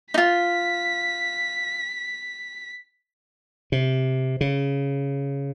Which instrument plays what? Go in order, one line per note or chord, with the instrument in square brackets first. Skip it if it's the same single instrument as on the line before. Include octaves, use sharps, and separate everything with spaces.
[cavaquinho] D#4 F4 [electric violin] B6
[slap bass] C3
C#3